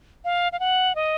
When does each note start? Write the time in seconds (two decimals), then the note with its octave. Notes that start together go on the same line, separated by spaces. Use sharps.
0.25 F5
0.52 F5
0.60 F#5
0.95 D#5